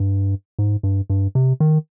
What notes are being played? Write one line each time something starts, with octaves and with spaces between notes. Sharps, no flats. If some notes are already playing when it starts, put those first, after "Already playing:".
Already playing: G2
G#2
G2
G2
C3
D#3